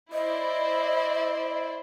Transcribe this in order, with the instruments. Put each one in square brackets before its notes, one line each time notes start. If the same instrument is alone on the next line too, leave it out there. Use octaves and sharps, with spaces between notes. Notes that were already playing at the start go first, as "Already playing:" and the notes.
[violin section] E4 C5 D5 [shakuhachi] D#5